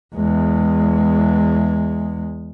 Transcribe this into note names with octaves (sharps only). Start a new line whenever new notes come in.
E2 G#3